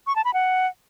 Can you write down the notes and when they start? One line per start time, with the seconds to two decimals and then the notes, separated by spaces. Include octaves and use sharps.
0.07 C#6
0.16 A5
0.25 B5
0.34 F#5